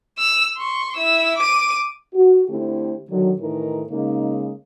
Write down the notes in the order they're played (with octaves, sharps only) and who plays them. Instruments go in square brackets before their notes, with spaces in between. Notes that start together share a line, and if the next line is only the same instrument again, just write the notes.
[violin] E6 F7
C6 C#6
E4 E6
D6 D#7
[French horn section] F#4
D3 A3 C4 E4 G4
D3 D#3 F#3
A2 D#3 E3 D#4 A#4
C#3 G#3 A#3 D#4